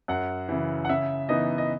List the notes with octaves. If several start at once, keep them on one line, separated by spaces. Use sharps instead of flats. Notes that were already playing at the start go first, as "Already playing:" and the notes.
F#2 F#5
C#3 E3
F#5
C#3 E5
E3 B3 D#4 D#5
D#5